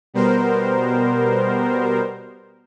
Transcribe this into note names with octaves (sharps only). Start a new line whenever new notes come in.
B2 G3 B3 A#4 C5